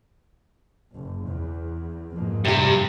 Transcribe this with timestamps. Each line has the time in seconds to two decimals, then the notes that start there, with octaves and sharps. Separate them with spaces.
0.93 F#1
1.24 E2
2.13 F2 G#2 A#3
2.45 G2 C3 G4